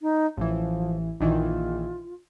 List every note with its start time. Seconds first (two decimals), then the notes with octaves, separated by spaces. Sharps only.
0.02 D#4
0.37 A1 E3 F3
1.20 A#1 D#3 E3 F4